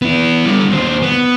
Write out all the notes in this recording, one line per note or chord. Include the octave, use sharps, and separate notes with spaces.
B3 E4
D3 G3
D#2 C5
B3